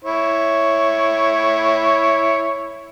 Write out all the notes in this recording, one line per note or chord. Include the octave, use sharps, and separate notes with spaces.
E4 C#5